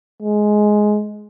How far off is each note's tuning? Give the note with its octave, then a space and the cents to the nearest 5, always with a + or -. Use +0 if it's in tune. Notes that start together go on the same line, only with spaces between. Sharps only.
G#3 +10